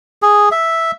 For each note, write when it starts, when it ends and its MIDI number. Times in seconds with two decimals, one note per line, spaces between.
0.22 0.49 68
0.52 0.91 76